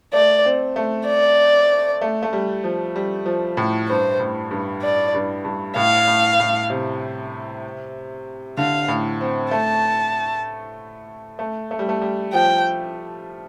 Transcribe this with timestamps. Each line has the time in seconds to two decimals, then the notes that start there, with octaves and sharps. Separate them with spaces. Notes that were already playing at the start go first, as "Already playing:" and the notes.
0.13 A3 D5
0.46 C4
0.76 A3
1.07 D5
2.01 A3
2.23 A3
2.33 G3
2.64 F3
2.96 G3
3.26 F3
3.57 A2
3.88 G2 C5
4.20 A2
4.51 G2
4.82 D5
5.14 G2
5.44 G2
5.76 A2 F5
6.07 A2
6.39 A2
6.70 C3
8.57 D3 F5
8.88 A2
9.21 C4
9.51 A3 A5
11.39 A3
11.71 A3
11.79 G3
11.89 A3
12.02 G3
12.33 F3 G5